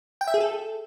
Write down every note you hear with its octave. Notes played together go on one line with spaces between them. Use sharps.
G5
E5
G#4
A4